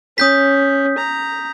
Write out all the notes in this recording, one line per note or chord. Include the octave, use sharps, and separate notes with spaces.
C#4 D#6 G6 B6
A#5